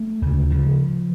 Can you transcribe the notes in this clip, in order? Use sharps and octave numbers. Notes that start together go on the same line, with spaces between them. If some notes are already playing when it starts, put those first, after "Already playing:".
Already playing: A3
D2 C#3
C#3 F3